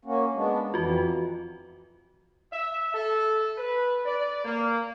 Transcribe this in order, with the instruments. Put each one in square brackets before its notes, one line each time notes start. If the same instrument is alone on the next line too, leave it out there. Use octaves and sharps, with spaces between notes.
[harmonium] A#3 C#4 F#4
G#3 B3 D4
[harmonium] F2 E3 [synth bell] F4 F#4
[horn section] E5
A4
B4
D5
A#3